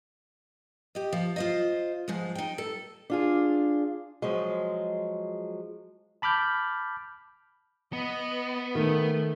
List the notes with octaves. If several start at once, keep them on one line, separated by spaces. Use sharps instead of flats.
G4 D#5
F3
F4 C5 D#5
G#2 F3 G#3
D#4 G5
A4
D4 F4 G#4
F3 F#3 G#3
A5 B5 D6 F6 G6
B3 D#5
D#3 A3